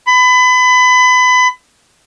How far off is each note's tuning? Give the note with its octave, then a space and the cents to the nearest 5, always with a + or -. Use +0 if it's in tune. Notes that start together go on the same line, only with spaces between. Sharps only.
B5 +30